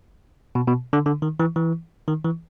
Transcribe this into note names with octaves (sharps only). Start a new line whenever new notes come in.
B2
B2
D3
D3
D#3
E3
E3
D#3
E3